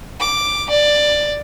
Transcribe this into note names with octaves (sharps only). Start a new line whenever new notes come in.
D6
D5